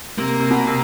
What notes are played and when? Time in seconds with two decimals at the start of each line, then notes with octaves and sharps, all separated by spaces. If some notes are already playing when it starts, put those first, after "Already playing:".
0.18 C3 A#3
0.40 C3
0.51 B2
0.67 C3